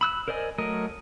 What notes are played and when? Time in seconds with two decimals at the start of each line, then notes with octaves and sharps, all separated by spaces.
0.01 B5 E6 F#6
0.28 A#4 C5 D5 D#5 G#5
0.58 F#3 A3 A#4 D#5